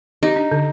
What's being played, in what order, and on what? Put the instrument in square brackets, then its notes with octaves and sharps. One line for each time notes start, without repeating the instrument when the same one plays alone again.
[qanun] D#4 [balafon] G4
[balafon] D4
D3